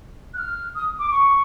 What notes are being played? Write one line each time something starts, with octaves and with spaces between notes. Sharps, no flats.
F#6
F6
D#6
D6
C#6